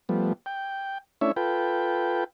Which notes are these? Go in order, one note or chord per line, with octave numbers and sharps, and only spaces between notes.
F3 G3 A3 B3
G5
A3 C#4 D4 E4 C#5 E5
F4 A4 B4 G5